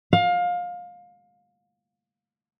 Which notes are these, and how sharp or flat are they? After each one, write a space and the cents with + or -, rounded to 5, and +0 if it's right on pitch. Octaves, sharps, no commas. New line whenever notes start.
F5 +25